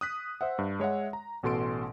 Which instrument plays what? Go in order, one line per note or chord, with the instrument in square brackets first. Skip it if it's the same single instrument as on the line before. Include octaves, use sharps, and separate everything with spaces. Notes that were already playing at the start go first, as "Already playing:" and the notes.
[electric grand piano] D#6 F#6 B6
C5 E5 F#5
G2
G#3 C#5 E5 F#5
A#5
A1 B2 A4 C6 D7